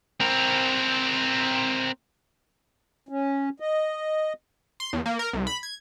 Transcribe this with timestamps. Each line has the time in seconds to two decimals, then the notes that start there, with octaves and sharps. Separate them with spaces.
0.20 C4 A#4
3.09 C#4
3.60 D#5
4.80 C6
4.93 E2
5.06 A#3
5.19 A#4
5.33 C2
5.47 B5
5.63 G#6